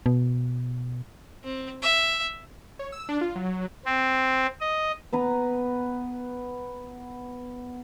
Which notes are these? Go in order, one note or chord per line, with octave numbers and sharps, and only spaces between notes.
B2
C4
E5
C#5
E6
D4
F4
F#3
F#3
C4
D#5
B3 B4 A#5